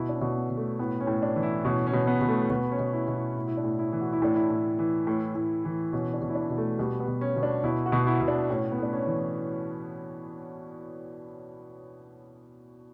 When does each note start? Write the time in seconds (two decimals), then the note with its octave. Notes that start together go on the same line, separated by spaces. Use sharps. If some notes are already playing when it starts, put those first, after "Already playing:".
Already playing: B2 E4
0.09 D4
0.15 C#4
0.21 B2
0.37 B3
0.50 B2
0.57 A3
0.79 A2 B3
1.00 C#4
1.07 A2
1.22 D4
1.36 E3
1.43 E4
1.65 B2 C#4
1.87 C#4
1.93 B2
2.07 B3
2.21 B2
2.28 A3
2.50 B2 B3
2.72 C#4
2.79 B2
2.93 E4
3.08 B2
3.15 E4
3.36 A2 E4
3.48 E4
3.57 D4
3.64 A2
3.79 E4
3.92 E3
4.01 F#4
4.12 E4
4.22 A2 D4
4.36 E4
4.50 A2
4.79 E3
5.07 A2
5.35 A2
5.65 E3
5.92 B2 C#4
6.14 D4
6.22 B2
6.30 E4
6.35 D4
6.50 B2
6.58 A3
6.79 B2 G3
7.00 B3
7.08 B2
7.21 C#4
7.36 B2
7.43 D4
7.64 B2 E4
7.86 F#4
7.92 B2
8.07 E4
8.21 B2
8.28 D4
8.49 A2 C#4
8.72 B3
8.79 A2 D4
8.93 C#4
9.07 E3